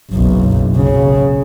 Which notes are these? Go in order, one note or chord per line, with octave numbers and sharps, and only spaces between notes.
F#1 B1
C#3